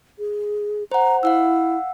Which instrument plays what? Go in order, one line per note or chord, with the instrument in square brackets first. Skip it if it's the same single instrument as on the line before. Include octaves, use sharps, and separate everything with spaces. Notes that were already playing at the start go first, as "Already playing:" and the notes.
[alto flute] G#4
[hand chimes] C5 F#5 [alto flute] A#5
[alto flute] E4 [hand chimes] F5 F#5 E6